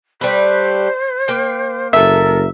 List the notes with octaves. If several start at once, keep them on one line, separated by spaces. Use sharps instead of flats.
G3 A3 B4 C5
A#3 G5
F#1 A4 A#4 E5